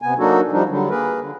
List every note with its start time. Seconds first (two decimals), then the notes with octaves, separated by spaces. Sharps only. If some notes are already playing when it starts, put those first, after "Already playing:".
0.02 C3 B3 G#5
0.19 F#3 A#3 D4 D#4 F#4 A4
0.52 F3 G3 D4 D#4
0.69 D3 F#3 G3
0.90 A#3 G#4 A#4 B4
1.20 D3